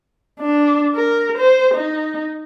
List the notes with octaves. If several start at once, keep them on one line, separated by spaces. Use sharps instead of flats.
D4
A#4
C5
D#4